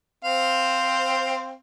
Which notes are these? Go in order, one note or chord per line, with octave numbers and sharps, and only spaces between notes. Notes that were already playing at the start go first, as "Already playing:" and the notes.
C4 C5 F5